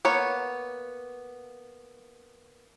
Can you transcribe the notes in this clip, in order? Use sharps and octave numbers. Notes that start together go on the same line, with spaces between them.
A#3 B3 C#5